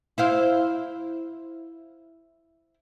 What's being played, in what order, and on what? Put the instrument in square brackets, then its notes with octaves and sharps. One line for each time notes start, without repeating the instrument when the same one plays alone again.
[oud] E4 C5 F5